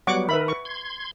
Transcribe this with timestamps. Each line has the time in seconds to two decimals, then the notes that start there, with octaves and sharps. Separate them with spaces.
0.07 F#3 G3 B3 F#5 C#6 D6
0.29 D#3 A#4 B4 E5 B5
0.48 C#6
0.65 C6 G#6